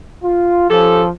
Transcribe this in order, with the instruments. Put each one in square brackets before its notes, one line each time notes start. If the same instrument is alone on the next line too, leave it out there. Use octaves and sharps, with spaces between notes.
[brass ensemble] F4
[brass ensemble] F3 [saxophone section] C#4 G4 A4